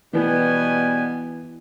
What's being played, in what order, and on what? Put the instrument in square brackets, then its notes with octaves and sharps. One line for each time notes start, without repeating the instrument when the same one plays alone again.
[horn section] B2 G3 G#5 [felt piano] E3 B4 [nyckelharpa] B3